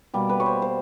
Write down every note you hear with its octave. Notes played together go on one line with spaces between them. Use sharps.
B2 G3 A#3
B4
C#5
C5
C5